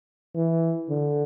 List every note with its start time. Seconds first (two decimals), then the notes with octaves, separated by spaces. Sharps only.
0.35 E3
0.89 D3